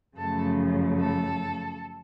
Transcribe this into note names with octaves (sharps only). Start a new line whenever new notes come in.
F#2 C#3 F3 A3 A4
A4